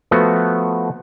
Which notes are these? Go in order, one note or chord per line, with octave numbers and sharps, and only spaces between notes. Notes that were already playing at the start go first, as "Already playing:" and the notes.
F3 A3 B3 F#4